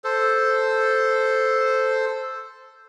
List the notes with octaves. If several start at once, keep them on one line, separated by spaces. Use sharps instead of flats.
A4 C5